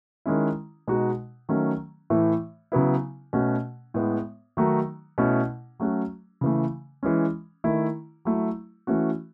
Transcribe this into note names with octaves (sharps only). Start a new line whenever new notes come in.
D#3 G#3 C#4 E4
B2 G#3 D#4 F#4
D#3 F#3 A3 C#4
A2 E3 A3
C#3 F#3 B3 E4
B2 A3 C#4 F#4
A2 G#3 B3
D#3 F#3 A3 D#4 F#4
B2 A3 C#4 E4
F#3 A3 C#4 F#4
C#3 E3 A3
E3 G#3 C#4
D#3 A3 E4
F#3 A3 E4
E3 A3 C#4 F#4